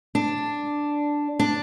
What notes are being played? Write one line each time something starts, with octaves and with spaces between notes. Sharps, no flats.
D4
D4